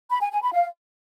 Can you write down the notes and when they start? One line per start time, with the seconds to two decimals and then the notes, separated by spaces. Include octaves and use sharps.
0.10 B5
0.21 G#5
0.31 G#5
0.42 B5
0.53 F5